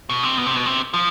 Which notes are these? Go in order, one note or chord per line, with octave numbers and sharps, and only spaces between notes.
B2
C3
B2
C3
B2
C3
F3